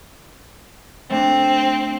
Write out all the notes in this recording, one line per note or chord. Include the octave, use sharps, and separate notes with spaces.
A3 C4 D4